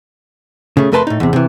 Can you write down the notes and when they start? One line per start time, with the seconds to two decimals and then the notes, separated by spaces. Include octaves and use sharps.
0.77 C#3 A3
0.92 F2 A3 A#4 B4 A5 C6
1.07 A2 D#4
1.20 E2 C3
1.33 C3 E3